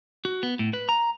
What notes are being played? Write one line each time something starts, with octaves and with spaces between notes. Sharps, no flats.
F#4
B3
A2
B4
A#5